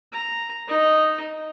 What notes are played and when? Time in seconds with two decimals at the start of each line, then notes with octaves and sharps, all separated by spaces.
0.12 A#5
0.68 D#4 D#5